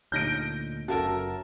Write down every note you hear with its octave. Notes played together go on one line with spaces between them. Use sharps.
D2 A#2 D3 D#4 C#5 G6 A#6 D7
F#1 C#4 F#4 A4 A#4 E5 A5